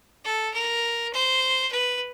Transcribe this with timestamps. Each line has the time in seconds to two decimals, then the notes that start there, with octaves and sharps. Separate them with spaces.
0.24 A4
0.54 A#4
1.13 C5
1.72 B4